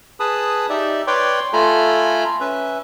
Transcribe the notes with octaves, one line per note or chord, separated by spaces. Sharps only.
G#4 B4 A5 B5 D#6
D#4 G4 D5 E5
B4 C#5 D5 G5 C6 D6
A3 F4 A4 G#5 A#5 B5
C#4 B4 E5